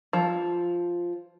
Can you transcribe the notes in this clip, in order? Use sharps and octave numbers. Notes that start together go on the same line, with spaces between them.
F3